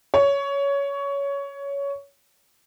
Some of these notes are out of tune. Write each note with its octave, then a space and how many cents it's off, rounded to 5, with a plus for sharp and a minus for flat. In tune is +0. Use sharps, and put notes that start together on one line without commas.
C#5 +15